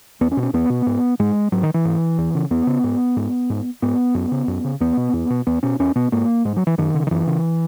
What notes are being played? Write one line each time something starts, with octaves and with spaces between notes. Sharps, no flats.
E2 B3
C#4
B2
C#4
E2 B3
B2
G#2
G#2 G#3
G#2 F#3
D#3
E3
G#2
E2
C#3
E2 B3
C#3
G#2
G#2
G#2
G#2 B3
F#2
C#3
F#2
C#3
E2 B3
B2
E2
B2
E2 B3
B2 C#4
E2 C#4
B2 B3
G#2 A#3
G#2 G#3
F#3
E3
F#2 D#3
C#3
D#3
F#2 E3
C#3